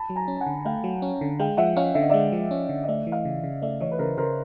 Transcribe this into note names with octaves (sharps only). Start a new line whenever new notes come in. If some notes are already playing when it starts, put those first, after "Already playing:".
Already playing: A5 B5
F#3
G#5 A#5
C#4
A5
F#5 G#5
D3
A3 F5 G5
F#3
C#4
D3
G#3 F5 G5
F3 E5 F#5
C#4 D#5 F5
D3 E5
D#5
G#3 D5 E5
F3
C#4
D3
D#5
A3 D5 E5
E3
D#5 F5
C#3
C#3
A3 D5 E5
E3 C#5 D#5
B4
C#3 A#4 C5
C#3 A#4 C5